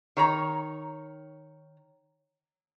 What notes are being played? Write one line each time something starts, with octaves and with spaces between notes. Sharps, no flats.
D#3 C#5 A#5